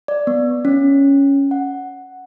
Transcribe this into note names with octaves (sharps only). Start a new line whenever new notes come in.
D5
B3
C#4
F#5